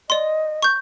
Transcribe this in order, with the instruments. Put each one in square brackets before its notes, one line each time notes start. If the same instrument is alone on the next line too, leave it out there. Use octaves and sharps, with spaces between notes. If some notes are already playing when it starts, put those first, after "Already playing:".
[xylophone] D5 C6 [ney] D#5
[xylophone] C#6 G6